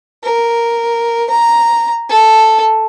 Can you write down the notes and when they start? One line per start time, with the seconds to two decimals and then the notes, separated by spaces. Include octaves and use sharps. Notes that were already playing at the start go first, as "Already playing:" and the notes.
0.24 A#4
1.30 A#5
2.09 A4